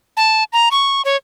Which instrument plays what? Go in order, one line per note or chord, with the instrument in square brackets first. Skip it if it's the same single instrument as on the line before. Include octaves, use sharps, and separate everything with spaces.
[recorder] A5
A#5
C#6
C#5